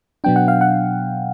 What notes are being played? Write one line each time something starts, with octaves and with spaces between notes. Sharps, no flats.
B2 F#3 B3 D4 G5
F#5
F5
F#5